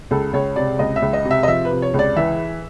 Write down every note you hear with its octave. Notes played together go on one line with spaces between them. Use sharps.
C#2 A4
C#2 C#5
C3 D5
C#2 D#5
E5
C#2
D#5
C3
E5
D#5
F3 E5
B4
C3
C#5
C#2
D5
E3 E5